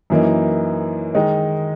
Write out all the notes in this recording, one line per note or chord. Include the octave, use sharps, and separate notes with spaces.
F#2 E3 A#3 D#4
D#3 G#3 D#4